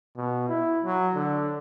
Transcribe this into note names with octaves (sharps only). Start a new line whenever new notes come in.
B2
E4
F#3
D3